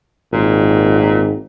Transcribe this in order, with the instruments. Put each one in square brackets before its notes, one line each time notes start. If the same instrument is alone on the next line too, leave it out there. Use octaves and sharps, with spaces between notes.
[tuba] G#1 [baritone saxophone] A#2